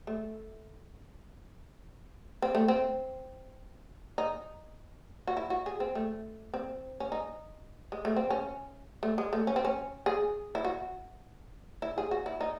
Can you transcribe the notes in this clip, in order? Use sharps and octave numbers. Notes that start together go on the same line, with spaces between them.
A3
C4
A3
C4
D#4
F#4
E4
F#4
G#4
C4
A3
C4
C#4
D#4
G#3
A3
C4
C#4
A3
G#3
A3
C#4
C4
C#4
G#4
E4
F#4
E4
G#4
F#4
E4
D#4